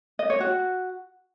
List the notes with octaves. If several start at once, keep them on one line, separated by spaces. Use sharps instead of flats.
D#5
C#5
F#4